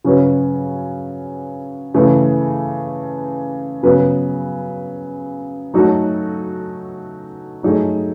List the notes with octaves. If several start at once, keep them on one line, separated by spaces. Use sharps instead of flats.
C#3 F#3 C#4 F#4 B4
C#3 E3 A3
C#3 F#3 B3 F#4 B4
F#3 A3 D#4 F#4 A4
F#3 A3 D#4 G#4